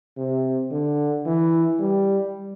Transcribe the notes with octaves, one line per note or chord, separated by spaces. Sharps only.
C3
D3
E3
G3